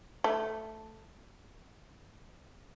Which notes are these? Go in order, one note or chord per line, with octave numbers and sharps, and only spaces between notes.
A3